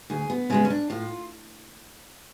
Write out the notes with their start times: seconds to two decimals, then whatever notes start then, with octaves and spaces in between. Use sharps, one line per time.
0.10 D2 G#4
0.30 B3
0.50 C#3 G#3 B3 C#4
0.65 C#4
0.70 D4
0.90 A2 F4